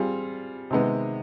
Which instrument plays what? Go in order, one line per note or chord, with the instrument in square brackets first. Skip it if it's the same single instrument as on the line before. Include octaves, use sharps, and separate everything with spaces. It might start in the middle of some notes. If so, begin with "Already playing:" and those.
Already playing: [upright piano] G3 C4 F4 G#4
C3 D#3 G#3 B3